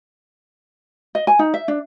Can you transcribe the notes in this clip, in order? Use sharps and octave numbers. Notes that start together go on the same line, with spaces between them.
D#5
G#5
D#4
E5
D4